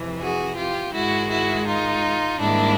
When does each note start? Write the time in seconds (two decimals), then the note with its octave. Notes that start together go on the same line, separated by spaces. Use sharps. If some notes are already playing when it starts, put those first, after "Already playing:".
Already playing: F2 C3 E3
0.20 F#4 G#4
0.57 F4 G4
0.93 G#2 D#3 G#3 E4 F#4
1.30 E4 F#4
1.67 D#4 F4
2.40 G#2 D#3 G3 A#3 D4 E4